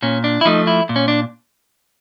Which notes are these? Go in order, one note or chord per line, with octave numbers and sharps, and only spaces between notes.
A#2 C#4
D4
E4
F3 A3 D#4
E4
A#2
C#4
D4